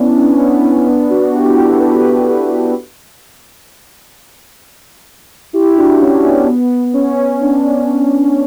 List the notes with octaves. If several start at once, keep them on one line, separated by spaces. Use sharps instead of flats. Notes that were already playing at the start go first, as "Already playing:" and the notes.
Already playing: B3 C#4 D4 E4
C#4
B3
C#4
B3 D4
D4 F#4
E4 G4
F#4 A4
G4 B4
E4 G4
D4 F#4
C#4 E4
B3 D4
B3
B3
C#4
B3 D4